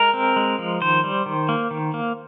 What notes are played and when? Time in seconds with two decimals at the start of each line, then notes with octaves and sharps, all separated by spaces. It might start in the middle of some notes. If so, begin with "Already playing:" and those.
Already playing: G#3 A#4
0.14 C4
0.36 G#3
0.59 F3
0.81 D#3 C5
1.04 G3
1.26 D#3
1.49 A#3
1.71 D#3
1.94 A#3